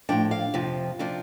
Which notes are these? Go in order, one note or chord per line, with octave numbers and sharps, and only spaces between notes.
A2 F3 D4 G5
F5
F2 C3 F3
C3 F3 D4 F4